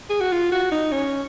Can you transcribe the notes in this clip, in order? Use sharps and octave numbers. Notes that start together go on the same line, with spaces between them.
G#4
F#4
F4
F#4
D#4
C#4